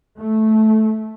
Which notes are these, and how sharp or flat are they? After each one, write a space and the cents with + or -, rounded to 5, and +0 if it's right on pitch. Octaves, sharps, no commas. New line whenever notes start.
A3 -10